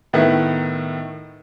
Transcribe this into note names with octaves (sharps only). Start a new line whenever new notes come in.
A2 D#3 B3 E4